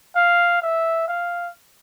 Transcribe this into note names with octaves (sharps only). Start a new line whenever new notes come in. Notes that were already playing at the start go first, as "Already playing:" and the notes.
F5
E5
F5